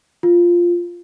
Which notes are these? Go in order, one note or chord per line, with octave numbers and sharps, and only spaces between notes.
F4